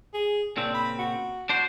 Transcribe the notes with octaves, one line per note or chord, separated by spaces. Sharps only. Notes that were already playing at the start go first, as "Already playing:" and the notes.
G#4
A#2 C#3 C4 D4
B5
F#4
D4 F#4 C5